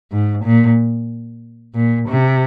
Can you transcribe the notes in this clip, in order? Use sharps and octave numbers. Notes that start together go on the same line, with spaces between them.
G#2
A#2
A#2
C3